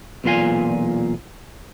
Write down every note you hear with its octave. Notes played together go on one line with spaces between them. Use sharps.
B1 E2 A#2 F4 F5 G#5